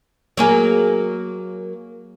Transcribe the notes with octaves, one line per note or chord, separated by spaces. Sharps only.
F#3 A#3 G#4